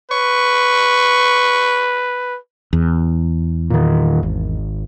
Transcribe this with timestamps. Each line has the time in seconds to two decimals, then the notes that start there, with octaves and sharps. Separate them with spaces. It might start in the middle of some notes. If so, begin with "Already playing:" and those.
0.11 B4 C#6
2.73 E2
3.70 A#2 D#3
4.23 G#1